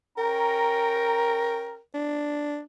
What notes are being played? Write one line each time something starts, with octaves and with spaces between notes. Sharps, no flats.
C#4 A#4 G5 A#5
D4